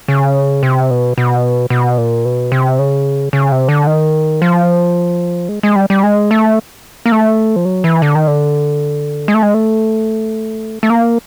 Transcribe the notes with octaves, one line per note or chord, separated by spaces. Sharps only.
C#3
C3
B2
B2
B2
A#2
B2
C3
C#3
C#3
C3
D3
D#3
F3
G#3
G#3
G3
G3
G#3
A3
A#3
A3
F3
F#3
E3
D3
D#3
D3
G#3
A3
G#3
A3
A3
A#3